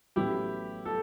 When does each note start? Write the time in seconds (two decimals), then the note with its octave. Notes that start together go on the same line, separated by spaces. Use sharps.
0.16 A1 A2 F#3 B3 E4 G4
0.85 A4